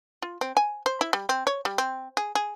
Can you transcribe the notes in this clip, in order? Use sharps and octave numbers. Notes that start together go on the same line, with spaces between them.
F4
C4
G#5
C5
E4
G3
C4
C#5
G3
C4
G#4
G#4